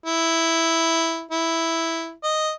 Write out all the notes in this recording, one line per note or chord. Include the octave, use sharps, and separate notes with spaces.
E4
E4
D#5